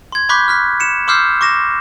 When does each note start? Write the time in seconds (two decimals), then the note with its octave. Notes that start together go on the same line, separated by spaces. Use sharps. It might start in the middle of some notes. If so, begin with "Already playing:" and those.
0.12 C6 G#6
0.29 B5 C#6 D6 F#6 G6 B6
0.48 F6 F#6 B6
0.80 C#7 E7
1.07 C6 D6 E6 F6 G6 C7
1.41 C#6 D6 A#6 E7